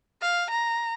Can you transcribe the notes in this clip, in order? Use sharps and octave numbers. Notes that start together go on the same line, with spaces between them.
F5
A#5